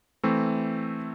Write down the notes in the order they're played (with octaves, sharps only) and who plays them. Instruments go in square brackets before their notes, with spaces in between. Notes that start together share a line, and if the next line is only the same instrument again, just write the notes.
[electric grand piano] E3 A3 C4